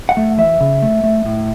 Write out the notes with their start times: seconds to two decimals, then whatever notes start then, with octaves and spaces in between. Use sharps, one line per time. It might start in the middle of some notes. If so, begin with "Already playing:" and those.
0.09 F#5
0.17 A3
0.38 E3 E5
0.60 C#3
0.82 A3
1.04 A3
1.25 A2